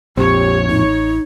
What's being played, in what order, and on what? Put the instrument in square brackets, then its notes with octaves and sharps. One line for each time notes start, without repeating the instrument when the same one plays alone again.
[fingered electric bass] A#1 F2 [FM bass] C4 [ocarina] G4 [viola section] C#5
[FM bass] A1 [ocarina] D#4